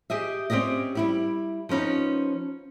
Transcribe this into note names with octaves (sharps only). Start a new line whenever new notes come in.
G4 G#4 D#5 E5
C4 C#4 G4 D5 D#5
G3 E4 G4
F3 B3 C#4 D#4